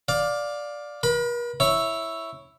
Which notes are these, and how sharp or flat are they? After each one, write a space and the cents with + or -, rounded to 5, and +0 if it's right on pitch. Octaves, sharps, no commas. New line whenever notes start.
D5 +0 F5 +20
A#4 +45 B5 +10
E4 +0 C#5 +0